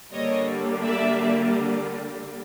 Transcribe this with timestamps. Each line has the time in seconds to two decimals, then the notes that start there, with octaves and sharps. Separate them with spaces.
0.12 D3 G3 A#3 C#5 D#5
0.83 D5 E5